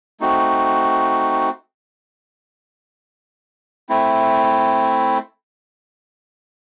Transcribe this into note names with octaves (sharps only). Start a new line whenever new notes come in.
A3 C4 D#4 F#4
A3 C4 E4